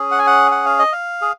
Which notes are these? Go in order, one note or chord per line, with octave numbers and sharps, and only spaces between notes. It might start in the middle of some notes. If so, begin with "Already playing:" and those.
Already playing: C#4 G#4
F#5
G#5
F#5
F#5
F5
D#5
F5
G#4